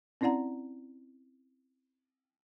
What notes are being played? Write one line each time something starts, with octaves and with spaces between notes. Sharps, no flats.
C4 C#4 E4 D5 F#5 A#5